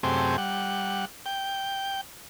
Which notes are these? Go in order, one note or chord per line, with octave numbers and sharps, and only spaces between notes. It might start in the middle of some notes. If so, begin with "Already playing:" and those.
F#2 C3 A3 C4 G4 G#4
G3 F#5
G5